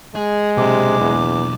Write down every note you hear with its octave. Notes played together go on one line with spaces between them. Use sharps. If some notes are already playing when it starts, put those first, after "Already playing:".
G#3 G#4
B1 C3 D4 D6
E2